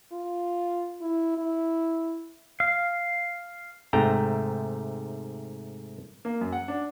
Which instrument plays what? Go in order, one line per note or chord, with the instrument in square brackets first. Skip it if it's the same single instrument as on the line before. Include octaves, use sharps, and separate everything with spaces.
[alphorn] F4
E4
E4
[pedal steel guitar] F5
[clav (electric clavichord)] G#2 C3 A3 G5 A#5
[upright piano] A#3
F#2
F#5
D4